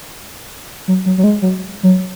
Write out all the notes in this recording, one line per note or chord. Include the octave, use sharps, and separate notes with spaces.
F#3
F#3
F#3
G#3
F#3
F#3